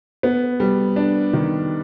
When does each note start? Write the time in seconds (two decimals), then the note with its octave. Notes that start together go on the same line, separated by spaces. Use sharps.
0.23 B3
0.60 G3
0.96 D4
1.33 D#3